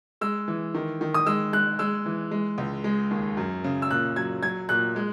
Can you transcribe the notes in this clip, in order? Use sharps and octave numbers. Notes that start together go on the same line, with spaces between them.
G#3 E6
E3
D#3
D#3
D#6
G#3 E6
G#3 F#6
G#3 E6
E3
G#3
C#2
G#3
D#2
F#2
C#3
E6
A#2 F#6
F#3 G#6
F#3 G#6
A#2 F#6
G#3